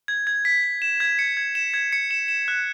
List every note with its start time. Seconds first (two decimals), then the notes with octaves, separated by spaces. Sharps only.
0.08 G#6
0.27 G#6
0.45 B6
0.64 B6
0.82 E7
1.00 G#6
1.19 C#7
1.37 G#6
1.55 E7
1.74 G#6
1.93 C#7
2.11 E7
2.28 E7
2.48 F#6